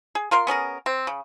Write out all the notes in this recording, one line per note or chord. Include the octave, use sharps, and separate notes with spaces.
G#4
F4 A#4 F5 C6
B3 C#4 G#4 A#4
C4
C#3